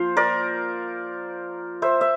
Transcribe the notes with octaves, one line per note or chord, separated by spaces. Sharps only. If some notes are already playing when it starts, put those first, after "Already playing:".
Already playing: F3 A#3 F4 C5 F5
A#4 D5
C5 E5
E5